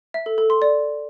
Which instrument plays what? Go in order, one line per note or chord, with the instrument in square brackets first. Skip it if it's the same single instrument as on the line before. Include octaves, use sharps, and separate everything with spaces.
[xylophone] E5
A4
A4
C6
D5